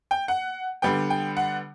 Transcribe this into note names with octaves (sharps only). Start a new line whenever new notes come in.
G5
F#5
D3 G3 B3 G5
G5
F#5